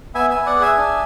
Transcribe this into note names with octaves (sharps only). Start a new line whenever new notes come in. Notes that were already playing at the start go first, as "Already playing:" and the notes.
B3 E5 G#5
E5 G#5
B3
D5 F#5
G#4
E5 G#5
D4